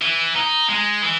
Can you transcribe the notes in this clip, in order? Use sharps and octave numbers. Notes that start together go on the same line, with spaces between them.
E3
D#4
G#3
E3